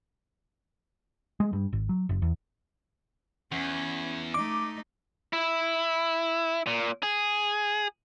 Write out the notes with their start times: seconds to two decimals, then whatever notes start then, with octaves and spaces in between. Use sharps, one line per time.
1.40 G#3
1.53 G2
1.73 G#1
1.89 F#3
2.09 F#1
2.22 E2
3.52 E2 C#4
4.34 A3 D#4 D6
5.33 E4
6.67 A#2
7.03 G#4